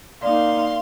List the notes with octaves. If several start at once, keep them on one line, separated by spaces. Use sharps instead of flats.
A#3 D#4 D5 F5 C6